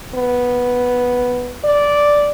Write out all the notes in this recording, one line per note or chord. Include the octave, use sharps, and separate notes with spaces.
B3
D5